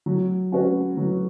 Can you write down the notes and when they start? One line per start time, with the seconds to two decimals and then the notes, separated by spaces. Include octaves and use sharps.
0.06 F#3
0.52 C#4 F#4 B4
0.97 F#3